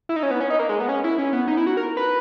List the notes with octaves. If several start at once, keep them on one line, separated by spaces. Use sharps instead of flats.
E4
D#4
C#4
B3
C#4
D#4
A#3
G#3
B3
C#4
E4
C#4
B3
D#4
E4
F#4
A#4
B4